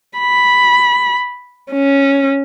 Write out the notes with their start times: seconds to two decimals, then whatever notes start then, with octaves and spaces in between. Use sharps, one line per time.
0.19 B5
1.71 C#4